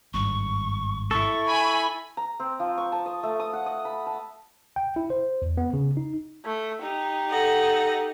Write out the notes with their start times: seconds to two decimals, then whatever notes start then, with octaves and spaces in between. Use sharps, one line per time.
0.14 G#1 G2 G3 C#6
1.11 E4 A4 C#6
1.48 G#5 B5
2.17 A#5
2.40 C4
2.60 F3
2.78 C#6
2.92 A5
3.06 D#5
3.23 A3
3.40 D#6
3.53 F#5
3.66 D#5
3.85 B5
4.07 A5
4.76 G5
4.96 E4
5.10 C5
5.42 E2
5.57 B3
5.73 C#3
5.97 D#4
6.45 A3
6.82 D#4 G4
7.29 A4 D#5 F#5